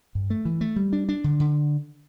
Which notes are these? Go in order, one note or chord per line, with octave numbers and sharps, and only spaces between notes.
G2
A3
E3
A3
G3
D4
D4
D3
D3